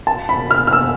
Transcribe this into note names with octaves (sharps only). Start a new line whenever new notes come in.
A5
B5
F6
F6
E6